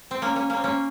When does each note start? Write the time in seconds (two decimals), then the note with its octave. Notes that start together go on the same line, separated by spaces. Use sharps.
0.11 C4
0.22 A#3 C#4
0.36 A#3 C#4
0.50 A#3 C#4
0.57 C4
0.64 A#3 C#4